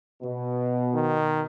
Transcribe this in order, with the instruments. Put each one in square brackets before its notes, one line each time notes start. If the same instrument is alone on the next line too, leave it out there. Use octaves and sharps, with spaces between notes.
[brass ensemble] B2
[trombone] D#3